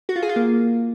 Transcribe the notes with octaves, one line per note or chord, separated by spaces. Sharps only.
F#4
F4
G#4
F4
A#3